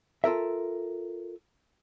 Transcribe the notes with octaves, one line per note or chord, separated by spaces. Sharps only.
F4 A4 A#4 E5